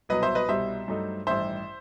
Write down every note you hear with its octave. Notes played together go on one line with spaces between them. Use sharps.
C2 B2 F#3 B4 D#5
C5 E5
B4 D#5
C2 B2 G3 C5 E5
G2 F#3 A3 D#4
A1 G2 D#3 C5 E5